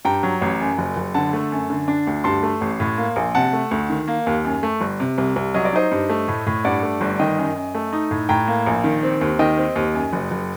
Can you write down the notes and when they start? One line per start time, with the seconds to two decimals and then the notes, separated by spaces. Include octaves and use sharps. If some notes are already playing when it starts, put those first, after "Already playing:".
0.05 G2 G5 A#5
0.23 F#3
0.41 A1
0.60 F#2
0.78 F#1
0.97 F#1
1.14 D3 F#5 A5
1.33 A3
1.52 F#2
1.70 D3
1.88 D4
2.07 D2
2.24 G2 A5 C6
2.43 A3
2.61 A1
2.80 A2
2.98 A#3
3.16 A#1
3.35 C3 F#5 A5
3.53 A3
3.71 D2
3.90 D#3
4.08 A#3
4.27 D#2
4.45 F#2
4.63 A3
4.81 G1
5.00 C3
5.18 C2
5.36 C2
5.54 F#3 D#5
5.65 D5
5.73 D#4 C5 D#5
5.91 G2
6.09 A3
6.28 A2
6.47 A2
6.65 G2 D5 F#5
6.83 A3
7.01 G1
7.19 D#3 D#5 G5
7.37 F#2
7.56 F#2
7.74 A3
7.93 D#4
8.11 A2
8.29 A2 G5 A#5
8.48 A#3
8.66 A#1
8.84 D#3
9.03 C4
9.21 D#2
9.39 D#3 D#5 G5
9.57 C4
9.76 D#2
9.94 F#2
10.13 F#1
10.31 F#1